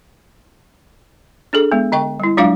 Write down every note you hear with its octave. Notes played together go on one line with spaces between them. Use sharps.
D4 G#4 A4
G#3 B3
D3 D#5 G5 C#6
G3 E4
F#3 G#3 D4 F4 F5 D6